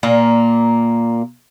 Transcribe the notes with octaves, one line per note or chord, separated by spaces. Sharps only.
A#2 A#3